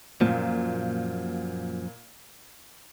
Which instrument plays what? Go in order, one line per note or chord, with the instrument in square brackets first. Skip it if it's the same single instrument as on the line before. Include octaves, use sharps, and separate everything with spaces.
[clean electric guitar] F#2 F3 [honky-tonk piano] A#2